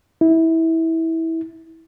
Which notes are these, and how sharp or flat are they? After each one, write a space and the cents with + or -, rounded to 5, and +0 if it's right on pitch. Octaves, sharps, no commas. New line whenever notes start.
E4 -20